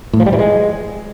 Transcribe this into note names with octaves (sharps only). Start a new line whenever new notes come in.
A2
F3
G3
E3
G#3